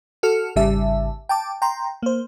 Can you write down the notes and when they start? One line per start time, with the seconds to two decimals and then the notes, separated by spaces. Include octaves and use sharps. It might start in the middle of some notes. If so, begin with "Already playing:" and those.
0.23 F#4 A4 F6 C#7
0.56 G#1 C#3 G3 E5 A5
1.29 G5 A5 D6
1.62 G5 A#5 C6
2.03 A#3 C5